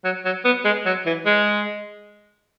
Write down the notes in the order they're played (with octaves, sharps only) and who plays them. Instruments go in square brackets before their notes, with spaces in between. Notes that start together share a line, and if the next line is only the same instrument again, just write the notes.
[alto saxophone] F#3
F#3
B3
G#3
F#3
E3
G#3